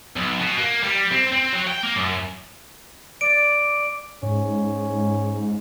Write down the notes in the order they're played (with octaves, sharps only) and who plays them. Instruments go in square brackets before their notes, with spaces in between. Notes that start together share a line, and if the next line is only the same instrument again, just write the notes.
[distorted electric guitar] B1
B2
A#3
G3
C4
C4
F#3
G5
A#3
F#2
[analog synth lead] D5 [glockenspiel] D7
[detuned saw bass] G#2 [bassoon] C#4